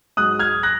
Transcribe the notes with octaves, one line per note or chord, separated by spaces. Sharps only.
G#2 F#3 D#6 F#6
F6 G#6
F#6 A#6